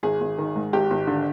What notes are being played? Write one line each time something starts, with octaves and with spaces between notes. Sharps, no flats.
G#1 G#4
G#1
D#3
G#2
G#1 G4
G#1
D3